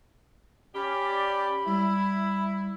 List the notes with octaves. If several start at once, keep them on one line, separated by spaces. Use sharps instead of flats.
C#4 G4 D5 B5
G3 E4